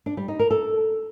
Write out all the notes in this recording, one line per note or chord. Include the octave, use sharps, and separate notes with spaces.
D4
G3
D#4
A#4
A4